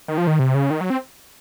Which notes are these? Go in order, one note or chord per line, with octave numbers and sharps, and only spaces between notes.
D#3
F3
D#3
C3
C#3
D#3
F#3
C4